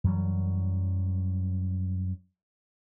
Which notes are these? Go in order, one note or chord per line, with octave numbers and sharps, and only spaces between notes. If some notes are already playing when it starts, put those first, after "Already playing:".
F#2 E3 F#3 G3